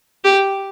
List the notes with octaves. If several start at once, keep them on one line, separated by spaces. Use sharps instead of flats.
G4